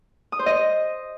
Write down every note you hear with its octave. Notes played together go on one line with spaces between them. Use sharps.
D#6
C5
D#5